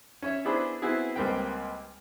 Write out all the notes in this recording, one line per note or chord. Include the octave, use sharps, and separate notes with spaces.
C#4 C#5 E5
B3 D4 E4 G#4 C5 B5
B3 C4 E4 F#4 G#4
C#2 G3 A#3 C4 B4 G5